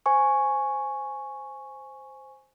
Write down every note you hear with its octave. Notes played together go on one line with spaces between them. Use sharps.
C5 G#5 C#6